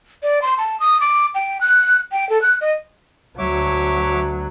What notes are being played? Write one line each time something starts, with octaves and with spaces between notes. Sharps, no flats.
D5
C6
A5
D#6
D6
G5
F#6
G5
A4
F#6
D#5
D2 F#3 C#5 E5 D6